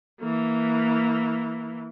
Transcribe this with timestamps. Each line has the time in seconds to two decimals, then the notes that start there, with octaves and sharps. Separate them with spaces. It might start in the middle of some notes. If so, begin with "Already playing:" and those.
0.19 E3 A#3